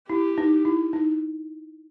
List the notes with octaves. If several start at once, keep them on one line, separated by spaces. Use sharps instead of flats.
E4 G4
D#4
E4
D#4